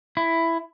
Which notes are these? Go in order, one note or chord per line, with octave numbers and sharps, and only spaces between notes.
E4